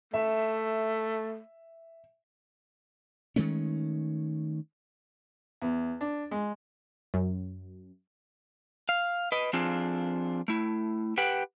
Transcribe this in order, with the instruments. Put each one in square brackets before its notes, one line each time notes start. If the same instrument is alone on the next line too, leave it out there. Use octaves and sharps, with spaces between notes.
[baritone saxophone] A3 [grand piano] E5
[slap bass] D#3 G#3 A3 C#4
[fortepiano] E2
D4
G#3
[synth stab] F#2
[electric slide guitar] F5
B4 D#5
F3 C4 D4 F4 G#4
A3 E4
G4 B4 F#5 G5